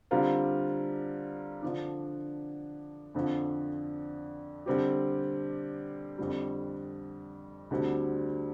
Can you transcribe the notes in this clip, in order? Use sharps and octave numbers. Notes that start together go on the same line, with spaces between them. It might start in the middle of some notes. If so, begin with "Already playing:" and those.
D3 G3 C4 F4 A#4
D3 F3 D4
F2 D3 F3
D3 G3 C4 G4
F2 D3 G3
D2 D3 G3 C4